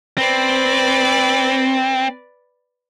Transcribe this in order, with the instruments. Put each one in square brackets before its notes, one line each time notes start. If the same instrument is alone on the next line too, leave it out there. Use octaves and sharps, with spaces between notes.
[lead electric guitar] C4 [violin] B4 D5